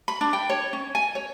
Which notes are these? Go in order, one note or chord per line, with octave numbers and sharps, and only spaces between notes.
B5
D4
G5
C#5
C#4
G#5
C#5